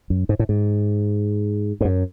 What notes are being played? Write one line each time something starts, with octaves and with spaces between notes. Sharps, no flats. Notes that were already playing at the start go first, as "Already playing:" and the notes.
F#2
G#2
A2
G#2
G#2
F#2